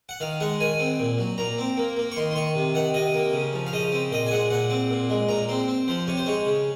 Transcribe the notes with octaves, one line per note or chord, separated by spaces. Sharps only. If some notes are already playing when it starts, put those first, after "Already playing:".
F#5
D#3 F5
G#3 F#5
D#3 G#5
C4
A#2
F#3
A#2 A#5
C4
A#3
A#3
C#6
D#3 C6
C6
D#3 C#6
C3
D#3 F#5
C3 D#5
A#3
C#3
F3
F5
C#3 D#5
C4
A#2 D#5
G#5
G#3 F#5
A#2 F#5
C4
A#2
G#3
A#2 A#5
C4 C6
C4
F3 C5
C3 C#5
C5
G#3 C#5
C#3